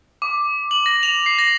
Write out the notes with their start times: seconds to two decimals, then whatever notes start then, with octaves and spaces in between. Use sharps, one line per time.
0.22 D6
0.71 F#7
0.86 A#6
1.03 F7
1.26 C7
1.39 A#6